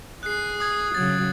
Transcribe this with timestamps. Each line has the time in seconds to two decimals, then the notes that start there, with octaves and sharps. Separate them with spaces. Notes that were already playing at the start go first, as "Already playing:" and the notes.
0.23 G#4 F#6 C7
0.60 D#6 G#6
0.95 C#3 F#3 G#6 A6